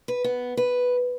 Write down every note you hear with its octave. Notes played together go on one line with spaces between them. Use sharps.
B4
B3
B4